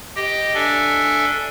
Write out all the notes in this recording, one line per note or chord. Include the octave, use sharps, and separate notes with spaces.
G4 D#5 G5
D4 A4 D5 E5 G#5